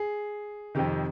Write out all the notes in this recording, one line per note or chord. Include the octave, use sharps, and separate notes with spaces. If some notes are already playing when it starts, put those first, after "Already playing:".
Already playing: G#4
F2 C3 D#3 G4